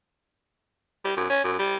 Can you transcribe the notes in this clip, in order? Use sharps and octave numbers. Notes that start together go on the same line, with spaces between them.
G3
F#2
C#4
F#2
G3